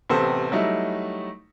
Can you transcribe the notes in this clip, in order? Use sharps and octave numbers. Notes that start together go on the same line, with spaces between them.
A1 C3 B3 A4 C5
F#3 G3 A3 D#4 E4